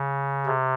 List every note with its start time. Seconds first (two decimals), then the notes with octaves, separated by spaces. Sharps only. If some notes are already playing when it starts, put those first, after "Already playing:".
Already playing: C#3
0.46 C3